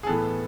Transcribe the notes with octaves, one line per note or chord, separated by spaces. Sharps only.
G#4
A2 E3 B3 A4